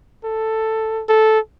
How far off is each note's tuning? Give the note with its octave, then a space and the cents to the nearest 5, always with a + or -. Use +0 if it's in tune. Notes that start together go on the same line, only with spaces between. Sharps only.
A4 +5
A4 -10